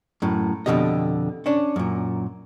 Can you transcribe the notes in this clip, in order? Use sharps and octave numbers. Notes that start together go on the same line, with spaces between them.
F#2 A2
F2 B2 D3 G4 D#5
C#4 D4
F#2 A#2